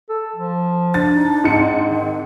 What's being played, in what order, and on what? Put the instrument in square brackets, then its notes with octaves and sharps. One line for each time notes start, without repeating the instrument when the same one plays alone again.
[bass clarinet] A4
F3
[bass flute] D4 [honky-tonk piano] A6
[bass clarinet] D#4
[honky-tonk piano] G#2 C#7 [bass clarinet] C4
[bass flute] D#3